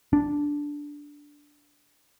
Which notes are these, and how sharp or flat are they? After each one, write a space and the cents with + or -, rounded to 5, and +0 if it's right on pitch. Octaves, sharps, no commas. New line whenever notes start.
D4 -5